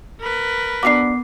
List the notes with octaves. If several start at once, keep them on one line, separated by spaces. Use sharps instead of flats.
A#4 B4
B3 D4 F4 F#4 D6 C7